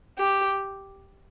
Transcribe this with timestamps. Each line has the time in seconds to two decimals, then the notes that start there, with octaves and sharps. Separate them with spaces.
0.19 G4